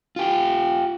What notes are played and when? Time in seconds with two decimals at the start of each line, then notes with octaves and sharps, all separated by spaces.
0.16 F4 G4